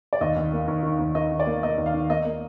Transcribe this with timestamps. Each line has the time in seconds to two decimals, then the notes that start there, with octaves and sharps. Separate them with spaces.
0.13 D5
0.21 D#2 D#5
0.36 D#2
0.52 A#3
0.68 D#2
0.83 D#3
0.99 D#2
1.15 D#3 D#5
1.31 D#3
1.40 D5
1.46 A#3
1.63 A#3 D#5
1.78 D#2
1.86 F5
1.94 D#3
2.09 A#3 D#5
2.25 A#3